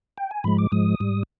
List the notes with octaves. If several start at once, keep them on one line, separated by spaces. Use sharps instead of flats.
G5
G#5
G#2 F3 G#3 B5
D6
G#2 F3 G#3 D#6
G#2 G3